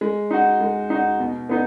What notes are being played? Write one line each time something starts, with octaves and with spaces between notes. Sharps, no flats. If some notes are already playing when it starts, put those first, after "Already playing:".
G#3
D#4 F#4
G#3
D#4 F#4
B2
B3 D#4